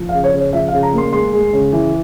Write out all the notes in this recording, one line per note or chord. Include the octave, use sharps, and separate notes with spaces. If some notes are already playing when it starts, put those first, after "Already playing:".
Already playing: F3
F5
C#3
C#5
C#3
C#5
F3 E5
F5
C#3
A#5
A#3 C6
G#3 C6
G#3
C#3
E3